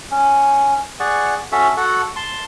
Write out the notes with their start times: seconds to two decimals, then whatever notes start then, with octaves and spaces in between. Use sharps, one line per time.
0.11 C#4
1.00 G#4 D5 F#5 C#6
1.52 C#4 F#4 A4 E5
1.77 F#4 A4 F#5
2.16 A5 C6